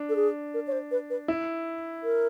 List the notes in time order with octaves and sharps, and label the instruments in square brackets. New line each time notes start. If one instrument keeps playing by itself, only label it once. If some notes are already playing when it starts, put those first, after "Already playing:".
Already playing: [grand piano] D4
[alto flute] A4
G#4
A#4
C#5
C5
B4
B4
[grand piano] E4
[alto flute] A#4